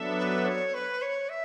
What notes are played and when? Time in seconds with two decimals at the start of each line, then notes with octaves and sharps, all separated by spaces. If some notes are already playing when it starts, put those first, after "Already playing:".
Already playing: F#3 B3 D4 A4 E5
0.18 B4
0.45 C#5
0.74 B4
1.02 C#5
1.29 E5